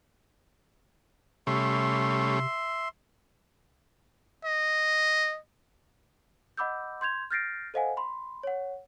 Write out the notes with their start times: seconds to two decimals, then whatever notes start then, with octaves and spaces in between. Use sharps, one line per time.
1.47 C3 G3 A3 C#4 E5 C6
4.45 D#5
6.57 D#5 F#5 B5 D6 E6 G6
7.01 C6 G6 G#6 F7
7.31 F6 G6 A6 A#6 C7 D7
7.74 A4 C5 D#5 F5 F#5 G#5
7.97 B5 C6
8.43 C#5 F#5